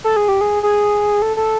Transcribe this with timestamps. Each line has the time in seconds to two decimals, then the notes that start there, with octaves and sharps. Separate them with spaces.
0.04 A4
0.16 G#4
0.28 G4
0.41 G#4
0.63 G#4
1.22 A4
1.37 A4